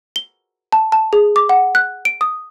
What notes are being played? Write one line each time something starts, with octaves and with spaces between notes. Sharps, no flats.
G7
A5
A5
G#4
D6
F#5
F#6
D7
D#6